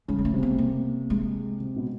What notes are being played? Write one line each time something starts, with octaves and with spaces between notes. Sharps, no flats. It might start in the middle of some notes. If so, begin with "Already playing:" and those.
C#3 G#3
G#3
A3
C3
B3
A#3
G#3
C3
B2